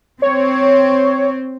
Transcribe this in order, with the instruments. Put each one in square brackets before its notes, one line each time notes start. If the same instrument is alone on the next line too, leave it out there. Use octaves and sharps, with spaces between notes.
[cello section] C4 [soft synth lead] C#5